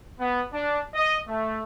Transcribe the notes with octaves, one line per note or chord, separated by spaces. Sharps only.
B3
D4
D#5
A3